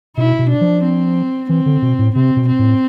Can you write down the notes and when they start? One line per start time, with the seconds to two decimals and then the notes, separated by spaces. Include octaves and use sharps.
0.17 B2 E4
0.39 B2
0.50 D4
0.61 F3
0.84 C4
1.49 E3 C4
1.66 D3
1.82 B2
1.99 A2
2.15 C3 C4
2.36 B2
2.48 C4
2.59 A2